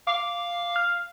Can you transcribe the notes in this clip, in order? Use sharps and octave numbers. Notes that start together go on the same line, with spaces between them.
F5 D6
F6